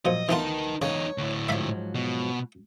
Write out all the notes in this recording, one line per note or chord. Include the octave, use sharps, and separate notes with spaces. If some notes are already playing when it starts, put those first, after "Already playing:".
A#2 F3 F#3 D#5
D2 E3 B3 D#4 F4 A#4 B4 A5
E2 C#3 D#4 C#5
D2 A2
G#2 F3 F#3 E5 F5 B5
B2